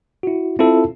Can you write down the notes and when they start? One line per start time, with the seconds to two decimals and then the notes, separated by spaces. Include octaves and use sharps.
0.23 E4 F#4
0.59 C4 E4 F4 A4